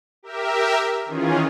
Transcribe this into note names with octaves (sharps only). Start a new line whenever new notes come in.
G4 A#4 E5
D#3 E3 C#4 F4 G#4